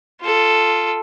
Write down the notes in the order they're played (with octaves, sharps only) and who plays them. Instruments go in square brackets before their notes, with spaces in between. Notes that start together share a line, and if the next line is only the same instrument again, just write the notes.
[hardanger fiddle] F4 A4